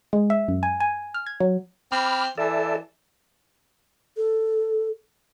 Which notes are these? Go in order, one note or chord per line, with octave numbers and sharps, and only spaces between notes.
G#3
E5
F#2
G#5
G#5
F6
G#6
F#3
C4 B5 D6 F6
E3 A4 D5 E5
A4